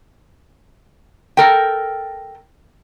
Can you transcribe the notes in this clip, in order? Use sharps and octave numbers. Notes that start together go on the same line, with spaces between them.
A4 A#4 G5